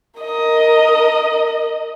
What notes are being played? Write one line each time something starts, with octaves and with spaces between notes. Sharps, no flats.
A#4 D#5